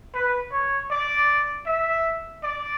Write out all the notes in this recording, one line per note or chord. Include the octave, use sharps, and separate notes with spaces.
B4
C#5
D5
E5
D5